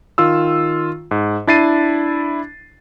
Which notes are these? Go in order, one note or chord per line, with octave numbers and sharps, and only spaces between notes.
D#3 F4 E6
G#2
D4 E4 A6 C7 D#7